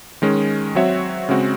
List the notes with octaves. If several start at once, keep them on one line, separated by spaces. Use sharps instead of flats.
D#3 G#3 C#4
F#3 C4 F#4 C#5 E5
C#3 G#3 C4 F#4